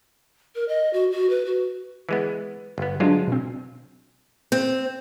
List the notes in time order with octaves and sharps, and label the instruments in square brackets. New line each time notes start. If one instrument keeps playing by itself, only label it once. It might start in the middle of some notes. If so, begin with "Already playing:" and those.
[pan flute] A#4
D#5
F#4
F#4
B4
F#4
[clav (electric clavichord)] E3 G#3 B3
G1 B3
[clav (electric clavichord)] D3 G#3 F4 [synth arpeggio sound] F#3 D4
[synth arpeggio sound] B2 C4
[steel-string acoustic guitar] C4